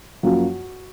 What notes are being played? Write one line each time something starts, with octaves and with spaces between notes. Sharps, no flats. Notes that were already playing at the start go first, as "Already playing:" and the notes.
F#2 F3 A#3 F#4